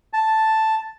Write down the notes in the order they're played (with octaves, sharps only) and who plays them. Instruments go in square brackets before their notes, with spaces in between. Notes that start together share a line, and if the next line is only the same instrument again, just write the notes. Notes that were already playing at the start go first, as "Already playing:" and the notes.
[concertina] A5